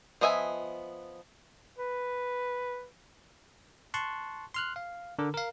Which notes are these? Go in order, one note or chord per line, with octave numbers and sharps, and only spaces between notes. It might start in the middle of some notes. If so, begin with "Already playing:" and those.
F3 B3 D#5 E5 G#5
B4
A5 C6 C#6 F#6
C6 F6 F#6
F5
D3 A#4
A#4 F5